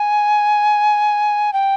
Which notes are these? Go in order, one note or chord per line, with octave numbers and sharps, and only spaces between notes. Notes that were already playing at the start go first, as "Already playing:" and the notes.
Already playing: G#5
G5